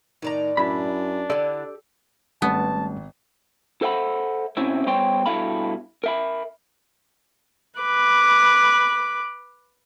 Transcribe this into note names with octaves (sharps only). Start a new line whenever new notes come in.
A2 D#3 D5 A#5
F#2 D4 E4 B5
D3 E4 G4 A4 D5
G#1 G3 A3 B3 C#4 A5
A4 C5 E5 F#5 G5 B5
B2 C4 C#4 E4 E5
G3 B3 C5 C#5 G5 C6
G2 B2 E4 A4 F5 B5
A#4 E5 B5
B4 D6